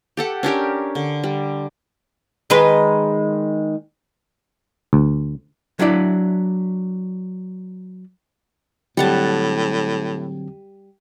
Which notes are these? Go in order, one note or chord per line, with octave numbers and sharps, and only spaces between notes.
G4 A4 F#5
C#4 D4 G4 A#4
D3
G3
D#3 G#3 B4
D2
F#3 D4 E4 D5
A2 D3 F#3 G3 C4 F#5 A5